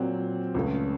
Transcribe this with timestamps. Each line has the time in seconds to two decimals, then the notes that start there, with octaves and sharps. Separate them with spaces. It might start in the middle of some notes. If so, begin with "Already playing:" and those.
Already playing: A#2 F#3 C4 F#4
0.54 C#2 C#3 A3 C#4